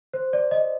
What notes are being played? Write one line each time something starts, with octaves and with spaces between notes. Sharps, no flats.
C5
D5
D#5